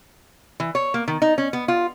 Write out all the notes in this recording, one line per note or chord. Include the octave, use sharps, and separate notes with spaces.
E3
C#5
A#3
D#3
D#4
C#4
B3
F4